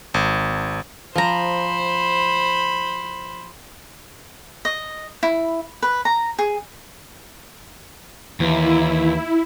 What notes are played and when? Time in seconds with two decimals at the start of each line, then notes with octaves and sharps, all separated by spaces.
0.14 G#1
1.16 F3 C5 A#5 B5
4.65 D#5
5.23 E4
5.82 B4
6.05 A#5
6.39 G#4
8.40 D#2 E3 E4